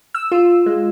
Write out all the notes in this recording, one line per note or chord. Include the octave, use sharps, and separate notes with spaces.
E6
F4
G#3